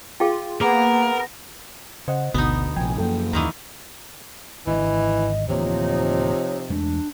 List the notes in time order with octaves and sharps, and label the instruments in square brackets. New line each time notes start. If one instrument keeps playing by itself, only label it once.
[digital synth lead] F4 [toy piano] G#4 F5 G5
[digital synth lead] A#3 [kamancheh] B3 [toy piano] G#4 [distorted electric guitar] A#4
[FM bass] C#3 [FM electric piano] C5 D#5 F#5
[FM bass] G#1 [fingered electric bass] D2 [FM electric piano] B2 [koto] B3 D#4
[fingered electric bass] A#1 C3 [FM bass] F3 [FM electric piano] G5 G#5
[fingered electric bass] F#2 G#3 A#3 [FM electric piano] A4 G5
[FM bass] D#2 [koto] A#2 D#3 E3 [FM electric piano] A#5 D#6
[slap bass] G#1 G#2 D3 [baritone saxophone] E3 [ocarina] D#5
[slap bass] D1 E3 A#3 [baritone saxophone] C3 [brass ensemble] F3 D#4 [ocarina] C#5
[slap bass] E2 G#3 A3 [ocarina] D4